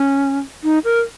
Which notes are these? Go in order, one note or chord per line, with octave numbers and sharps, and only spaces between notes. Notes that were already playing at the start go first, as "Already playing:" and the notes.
Already playing: C#4
D#4
A#4